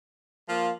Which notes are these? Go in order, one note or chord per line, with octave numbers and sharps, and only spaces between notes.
F3 A#3 F4